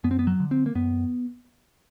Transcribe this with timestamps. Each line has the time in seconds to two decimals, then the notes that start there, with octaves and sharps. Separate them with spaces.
0.04 F#2 B3
0.11 C4
0.19 B3
0.27 F#3
0.40 D3
0.51 C4
0.66 A#3
0.75 F#2 B3